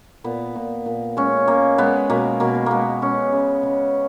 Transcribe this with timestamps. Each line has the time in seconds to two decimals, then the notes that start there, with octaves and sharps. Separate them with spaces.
0.24 A#2 B3
0.56 A#2
0.86 A#2
1.17 G#3 C#4
1.48 G#3 A#3
1.78 G#3 B3
2.10 B2 A#3
2.40 B2 A#3
2.66 G#3 A#3 B3
3.02 G#3 C#4
3.33 C#3
3.63 C#3